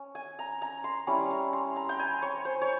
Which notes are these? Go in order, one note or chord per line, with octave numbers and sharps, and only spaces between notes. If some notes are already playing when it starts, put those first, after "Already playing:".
Already playing: C#4
G#5
A#5
A#5
C6
G3 C#4 E4
A#5
C6
A#5
G5
G#5
C#5
C5
C#5